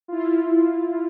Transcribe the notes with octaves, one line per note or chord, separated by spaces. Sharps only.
E4 F4